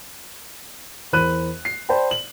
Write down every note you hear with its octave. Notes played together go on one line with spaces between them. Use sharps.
E2 A#4 C5 B5 F#6 D#7
C7
C5 D5 G5 A5 B5
F#7